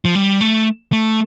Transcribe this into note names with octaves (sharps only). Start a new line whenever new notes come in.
F3
G3
A3
A3